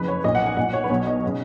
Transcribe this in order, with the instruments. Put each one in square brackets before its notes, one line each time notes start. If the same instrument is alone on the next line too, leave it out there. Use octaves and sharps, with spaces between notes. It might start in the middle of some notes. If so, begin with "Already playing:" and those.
Already playing: [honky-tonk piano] F#1 F2 C#3 B4
C#5
A#2 D#5
B1
F#5
G#5
B1 A#2 F#5
C#5
B4
B1 B2 C#5
D#5
C#3